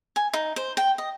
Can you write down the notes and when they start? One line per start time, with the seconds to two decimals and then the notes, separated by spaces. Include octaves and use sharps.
0.16 G#5
0.33 D#4
0.56 C5
0.77 G5
0.98 D#5